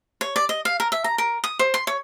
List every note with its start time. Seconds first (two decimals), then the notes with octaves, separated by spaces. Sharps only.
0.21 C#5
0.36 D5
0.49 D#5
0.65 F5
0.80 A#4
0.92 E5
1.04 A#5
1.18 A#4
1.44 D#6
1.59 C5
1.74 C6
1.87 C#5